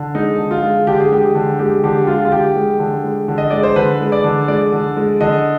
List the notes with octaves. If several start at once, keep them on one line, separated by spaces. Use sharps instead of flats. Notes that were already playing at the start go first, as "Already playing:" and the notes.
Already playing: D3
G#3 D#4
D3
F4
G#3
D3 G4
G#4
G#3 G4
D3
G#3 G4
D3 G4
G#3 F4
F4
D3 G4
G#3
D3
G#3
D3
D#5
G#3 D5
C5
D3 B4
G#3
D5
D3
G#3 D5
D3
G#3
D3 D#5